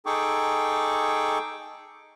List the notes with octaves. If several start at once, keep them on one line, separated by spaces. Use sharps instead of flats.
D#4 G#4 A4 G5 C#6 D6